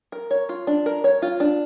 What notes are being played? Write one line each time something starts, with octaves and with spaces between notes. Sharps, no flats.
A#4
C#5
F4
D4
A#4
C#5
F4
D4